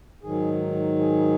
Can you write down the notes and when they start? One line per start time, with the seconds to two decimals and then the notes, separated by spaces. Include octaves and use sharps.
0.22 G#2 D#3 F#3 G#4
0.99 G#4